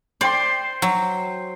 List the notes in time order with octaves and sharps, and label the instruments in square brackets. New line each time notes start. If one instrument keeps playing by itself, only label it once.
[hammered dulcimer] C5 G5 C6 [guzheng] D5
[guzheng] F#3